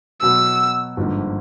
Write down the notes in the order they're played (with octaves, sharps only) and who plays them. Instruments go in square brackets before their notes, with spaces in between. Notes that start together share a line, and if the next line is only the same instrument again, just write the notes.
[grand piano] B2 F#3 B3 [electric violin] E6
[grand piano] G#1 G2 D3 F3 A#3